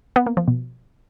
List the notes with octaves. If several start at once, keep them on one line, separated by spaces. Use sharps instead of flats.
B3
A#3
F3
B2